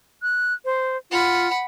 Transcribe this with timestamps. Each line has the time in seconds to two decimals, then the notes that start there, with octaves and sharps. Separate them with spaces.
0.22 F#6
0.65 C5
1.11 F4 F#5 B5